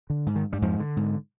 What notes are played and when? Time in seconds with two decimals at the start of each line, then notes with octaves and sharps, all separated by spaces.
0.10 D3
0.26 G#2
0.36 D#3
0.53 G2 G3
0.62 F2 G#2 F3
0.80 D3
0.97 G#2